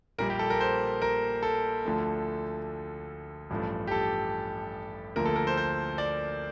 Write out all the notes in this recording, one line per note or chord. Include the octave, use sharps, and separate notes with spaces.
A#1 A#2 G3 A#3 A#4
G4
A4
A#4
C5
A#4
A4
D2 D3 F3 A3
A1 G2 F3 A3
G4
A4
D2 D3 F3 A#3 A#4
A4
A#4
C5
C5
D5